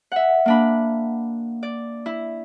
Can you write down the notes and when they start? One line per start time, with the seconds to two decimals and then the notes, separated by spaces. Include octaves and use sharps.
0.12 E5 F#5
0.46 A#3 D4 B5
1.63 D5
2.06 E4